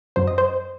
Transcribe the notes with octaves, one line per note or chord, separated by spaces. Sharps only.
F#2 F#3 C5
D#5
C5